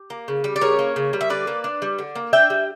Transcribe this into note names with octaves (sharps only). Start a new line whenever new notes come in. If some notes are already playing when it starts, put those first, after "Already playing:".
Already playing: G4
A#3
C#3
G3
D5
C#3 A#4 C#5
A#3
C#3
G3
E5
D3 B4 D5
A#3
D4
G3
D3
A#3
D4 E5 G5
G3